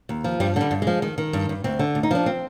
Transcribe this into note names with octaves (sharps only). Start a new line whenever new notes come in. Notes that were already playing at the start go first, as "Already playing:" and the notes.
D#2
F3
G2 G3
D3 G3
G2
G#3
F3
D#3
D#3
G2
G2
D2 C4
D3
D2
D#4
F3 D4
C4